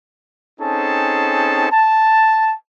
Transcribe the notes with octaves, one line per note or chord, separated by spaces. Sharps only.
C4 C#4 D#4 G#4 A4 A5
A5